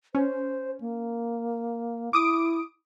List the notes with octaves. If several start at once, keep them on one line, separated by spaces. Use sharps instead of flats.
C#4 C5
A#3
E4 D6 D#6 D7